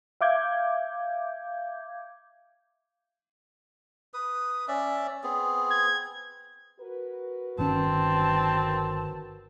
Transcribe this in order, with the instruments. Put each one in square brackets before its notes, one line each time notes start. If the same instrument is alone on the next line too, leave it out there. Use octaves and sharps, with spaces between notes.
[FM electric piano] E5 F5 D6 G6 G#6
[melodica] B4 D#6
C#4 D5 E5
B3 C4 G#4
[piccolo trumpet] G#6
[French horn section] F#4 A#4 B4
[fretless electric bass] G1 D#3 C#4 [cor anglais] C4 [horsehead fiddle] A5